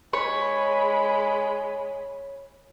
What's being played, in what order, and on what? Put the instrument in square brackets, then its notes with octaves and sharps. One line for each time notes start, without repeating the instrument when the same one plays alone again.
[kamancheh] G#3 B5 [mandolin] C#5